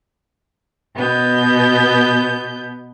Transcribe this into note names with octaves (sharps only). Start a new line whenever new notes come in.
B2 B3 G6